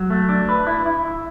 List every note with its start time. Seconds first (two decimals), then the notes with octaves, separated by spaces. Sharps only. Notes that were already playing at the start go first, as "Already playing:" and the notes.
Already playing: F#3
0.10 A3
0.29 D4
0.49 B4
0.67 E4
0.86 E4
1.05 E4